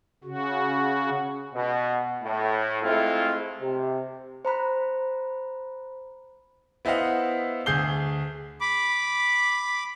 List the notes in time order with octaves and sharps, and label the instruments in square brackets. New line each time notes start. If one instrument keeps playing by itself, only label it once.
[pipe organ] C#3 F#4
[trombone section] B2
A2
G#3 A3 C4 E4 F4 A4
C3
[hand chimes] C5 A#5 B5 F#6
[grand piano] B3 E4 C5 D#5 F5 F#5
D2 G#4 G6 C7 G7
[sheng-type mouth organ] B5 D6